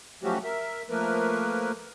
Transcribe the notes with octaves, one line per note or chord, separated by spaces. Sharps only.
F3 F#3 A3 C#4 F#4 G4
A#4 E5
F3 A3 A#3 A#4 B4